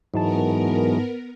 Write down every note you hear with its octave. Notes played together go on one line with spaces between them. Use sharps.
G#2 E3 F#3 G#3 B3 D#4 A#4 A5